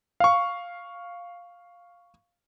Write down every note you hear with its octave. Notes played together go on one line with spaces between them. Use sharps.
F5 C#6